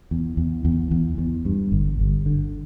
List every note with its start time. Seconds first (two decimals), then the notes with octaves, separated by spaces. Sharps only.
0.11 E2
0.37 E2
0.65 E2
0.91 E2
1.18 E2
1.45 G2
1.72 G1
1.99 G1
2.26 D3